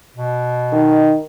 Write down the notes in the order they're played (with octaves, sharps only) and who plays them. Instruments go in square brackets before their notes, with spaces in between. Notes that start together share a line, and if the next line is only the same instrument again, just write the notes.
[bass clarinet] B2
[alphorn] D#3